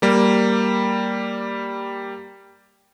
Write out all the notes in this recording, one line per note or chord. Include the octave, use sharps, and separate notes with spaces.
G3 A#3